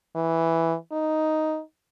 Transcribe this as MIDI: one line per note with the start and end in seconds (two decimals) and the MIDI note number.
0.16 0.75 52
0.92 1.61 63